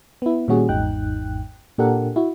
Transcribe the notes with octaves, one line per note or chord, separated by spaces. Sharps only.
B3 E4
A#2 D#3 G3 C#4 F#4 G#4
G#1 E2 G#2 D#4 G5 F#6
A#2 D4 G4 A4 A#4 F#5
E4 F#4